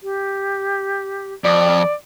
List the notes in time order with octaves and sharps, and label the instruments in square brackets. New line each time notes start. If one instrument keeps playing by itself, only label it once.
[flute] G4
[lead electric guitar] F2 [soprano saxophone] D5